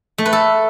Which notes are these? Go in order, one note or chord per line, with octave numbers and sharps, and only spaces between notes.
A3
B4
A4